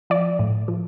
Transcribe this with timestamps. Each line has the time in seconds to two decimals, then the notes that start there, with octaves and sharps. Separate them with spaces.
0.10 F3 D5
0.39 A2
0.68 F3